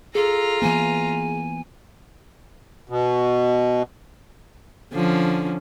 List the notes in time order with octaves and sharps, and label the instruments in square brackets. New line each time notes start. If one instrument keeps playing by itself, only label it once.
[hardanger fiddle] F4 A#5 [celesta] G#4 [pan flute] A4
[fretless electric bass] E3 A#3 B3 [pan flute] G#5
[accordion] B2
[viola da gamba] D3 F3 C#4